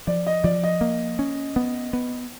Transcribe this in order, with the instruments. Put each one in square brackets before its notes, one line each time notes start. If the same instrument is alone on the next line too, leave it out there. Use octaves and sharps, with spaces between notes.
[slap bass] F3 [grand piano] D5
[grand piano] D#5
[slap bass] F3 [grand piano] D5
[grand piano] D#5
[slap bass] A#3
C#4
B3
B3